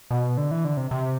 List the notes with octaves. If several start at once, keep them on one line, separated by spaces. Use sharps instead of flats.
B2
D3
E3
D3
C3
C3